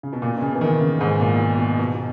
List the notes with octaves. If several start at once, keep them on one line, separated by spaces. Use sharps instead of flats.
C#3
B2
A#2
B2
C#3
E3
D#3
C#3
G#2
A#2
B2
B2
B2
B2